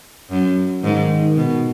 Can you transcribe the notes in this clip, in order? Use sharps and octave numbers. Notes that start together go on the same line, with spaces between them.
F#2
G#2 D#3
B2